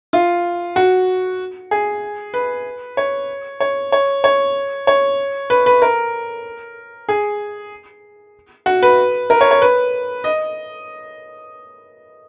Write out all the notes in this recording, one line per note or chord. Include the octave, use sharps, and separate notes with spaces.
F4
F#4
G#4
B4
C#5
C#5
C#5
C#5
C#5
B4
B4
A#4
G#4
F#4
B4
A#4
C#5
C#5
B4
D#5